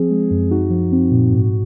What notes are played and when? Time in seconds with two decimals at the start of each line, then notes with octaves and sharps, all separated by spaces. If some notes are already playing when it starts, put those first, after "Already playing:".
Already playing: F3 C4 G#4
0.10 G#3
0.31 F#2
0.51 D#4 F#4
0.70 F3
0.92 C4
1.11 A#2
1.32 G#2